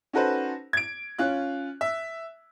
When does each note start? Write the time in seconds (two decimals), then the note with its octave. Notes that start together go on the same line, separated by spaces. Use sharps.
0.13 C#4 D#4 F#4 A4 B4 C5
0.73 G#6 D7
1.19 C#4 F4 F#6
1.81 E5